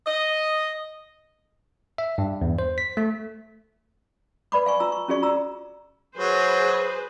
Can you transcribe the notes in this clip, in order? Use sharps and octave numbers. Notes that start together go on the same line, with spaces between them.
D#5
E5
G2
E2
C5
B6
A3
B4 D5 B5 D6
F5 G#5 C#6
F4 A#5 E6
C#6
C#4 F4 F#4 G#4 D5 C#6
F4 A#5 E6
F#3 G#4 B4 C5